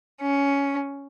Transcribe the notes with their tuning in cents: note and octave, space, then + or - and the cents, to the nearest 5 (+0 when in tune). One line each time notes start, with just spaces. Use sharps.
C#4 +10